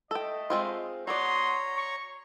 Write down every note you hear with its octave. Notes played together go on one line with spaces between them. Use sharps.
A3 A4 D#5 G5
G#3 C4 F4
B3 F#4 C#5 D5 A#5 C6 D#6
C#6